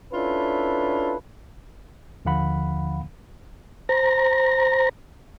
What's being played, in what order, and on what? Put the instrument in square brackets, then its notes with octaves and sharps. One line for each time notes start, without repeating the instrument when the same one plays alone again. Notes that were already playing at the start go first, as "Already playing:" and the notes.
[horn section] C#4 D4 E4 F4 A4 B4
[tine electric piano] D#2 D3 F3 F5 F#5 B5
[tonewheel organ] C5 A#5 A#6